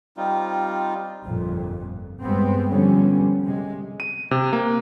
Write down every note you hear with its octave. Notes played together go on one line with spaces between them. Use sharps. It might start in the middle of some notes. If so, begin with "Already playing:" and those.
G3 C4 D#4 F4
G1 F2 A#2
G2 G#3 B3 C4
D3 F3 G3 B3 C#4
C3 G#3
D#7
C3
A#3